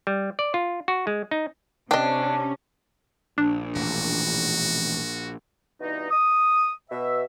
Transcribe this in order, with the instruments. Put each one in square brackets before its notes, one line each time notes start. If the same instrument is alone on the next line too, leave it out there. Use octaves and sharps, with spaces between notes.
[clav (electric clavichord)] G3
D5
F4
F#4
G#3
D#4
[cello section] C3 C#4 [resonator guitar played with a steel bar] D4 [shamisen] D#5 G5
[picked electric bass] A#1 [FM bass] D4
[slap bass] E1 A1 E2 [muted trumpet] F#4
[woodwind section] G2 B2 E3 D#4
D#6
B2 E5